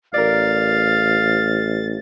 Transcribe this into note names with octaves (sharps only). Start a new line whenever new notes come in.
A1 A#4 D5 F5 A6